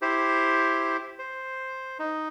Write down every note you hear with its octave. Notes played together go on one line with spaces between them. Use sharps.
E4 G4 C5
C5
D#4